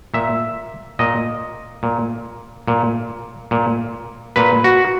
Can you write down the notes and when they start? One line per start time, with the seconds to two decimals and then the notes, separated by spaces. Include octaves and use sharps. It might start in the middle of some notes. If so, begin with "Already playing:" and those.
0.14 A#2 E5
0.99 A#2 D#5
1.83 A#2
2.68 A#2
3.51 A#2
4.36 A#2 B4
4.64 F#4